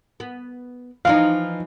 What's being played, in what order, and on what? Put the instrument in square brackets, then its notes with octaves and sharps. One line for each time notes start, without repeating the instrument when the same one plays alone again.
[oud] B3
[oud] E3 F3 D#4 [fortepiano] F5